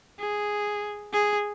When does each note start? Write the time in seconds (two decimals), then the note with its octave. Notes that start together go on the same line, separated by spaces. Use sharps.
0.19 G#4
1.13 G#4